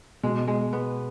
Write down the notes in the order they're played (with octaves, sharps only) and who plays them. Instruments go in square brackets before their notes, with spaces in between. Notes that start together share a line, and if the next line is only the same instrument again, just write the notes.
[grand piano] B2 [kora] G#3
[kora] G#3
B3